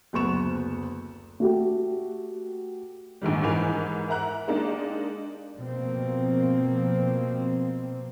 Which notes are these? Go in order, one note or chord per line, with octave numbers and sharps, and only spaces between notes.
F#1 D2 B3 C#6 E7
A3 F#4 G4
A#1 G#2 D#3 G3
G#2 E3 A#4 G#5 B5 F7
A#4 E5 F#5 A#5 F#6
G#3 A#3 D4 D#4 G4
B2 F3 A#3 C4